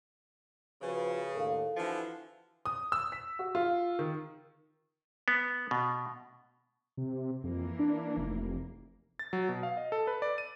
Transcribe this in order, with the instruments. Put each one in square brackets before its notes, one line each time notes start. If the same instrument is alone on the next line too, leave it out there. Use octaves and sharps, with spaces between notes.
[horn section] C#3 [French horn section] F3 F#4 B4
[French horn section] D#2 A2 D3 [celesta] A4 A#4 F5
[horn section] D3 F3 [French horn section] E3 F#4
[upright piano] D#6
E6
B6
F#4
F4
D#3
[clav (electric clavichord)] B3
B2
[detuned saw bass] C3
[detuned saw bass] F2 [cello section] E3 A#3
[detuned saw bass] D4
F1
[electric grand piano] A6
F#3
B2
F5
D#5
A4
B4
D5
D#7